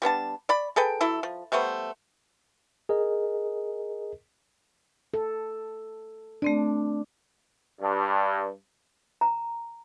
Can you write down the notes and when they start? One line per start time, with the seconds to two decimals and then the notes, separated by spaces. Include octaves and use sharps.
0.02 G3 B3 D4 A5
0.49 D5 B5
0.76 G#4 A4 B4 G5
1.01 F#3 E4 A4
1.23 F3
1.52 G3 A3 B3 C5
2.89 G#4 A#4 D#5
5.14 A4
6.42 A3 C4 D4 D5
7.80 G2
9.21 A#5